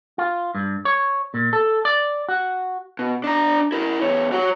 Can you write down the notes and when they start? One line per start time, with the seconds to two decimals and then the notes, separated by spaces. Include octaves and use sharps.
0.18 F4
0.55 G2
0.85 C#5
1.34 A#2
1.53 A4
1.85 D5
2.29 F#4
2.99 B2
3.24 D4 A#5
3.72 E4 A#4
4.01 E2 C#5
4.32 F#4 C#5